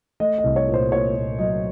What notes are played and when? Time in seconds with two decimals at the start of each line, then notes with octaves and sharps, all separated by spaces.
0.20 A3 D#5
0.38 D#5
0.44 C2
0.56 C#5
0.68 A#2
0.74 C5
0.92 A#2 C#5
1.15 A#2
1.39 F#3 D#5